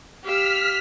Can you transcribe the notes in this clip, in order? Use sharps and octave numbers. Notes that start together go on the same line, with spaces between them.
G4 F5 E6 F6 B6